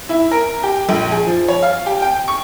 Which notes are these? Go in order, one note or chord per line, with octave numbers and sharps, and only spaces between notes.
E4
A#4
G4
A#1
G#4
F3
C#5
F5
G4
G5
C#6